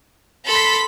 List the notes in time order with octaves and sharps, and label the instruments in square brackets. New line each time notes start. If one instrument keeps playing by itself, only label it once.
[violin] A4 [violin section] B5 B6 [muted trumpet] C6